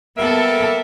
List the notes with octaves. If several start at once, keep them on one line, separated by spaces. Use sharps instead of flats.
G3 A#3 B3 A4 E5